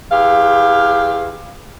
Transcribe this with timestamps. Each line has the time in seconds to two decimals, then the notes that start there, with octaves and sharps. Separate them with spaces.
0.11 E2 G4 F5